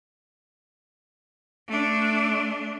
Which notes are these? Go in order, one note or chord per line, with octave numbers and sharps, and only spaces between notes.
A3 D4